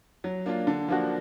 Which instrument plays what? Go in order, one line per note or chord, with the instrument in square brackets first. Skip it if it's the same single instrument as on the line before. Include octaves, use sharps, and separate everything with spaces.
[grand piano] F#3
A#3 D4 F4
D3
F3 A#3 D4 F#4